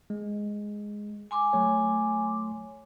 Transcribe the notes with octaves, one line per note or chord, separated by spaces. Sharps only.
G#3
G#5 C6 D6
F#3 A3 C#5